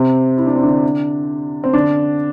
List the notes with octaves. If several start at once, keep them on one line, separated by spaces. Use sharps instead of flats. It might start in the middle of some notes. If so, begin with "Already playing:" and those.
Already playing: C3 C4
E4
D4
C4
D3 D4
C4
D3 D4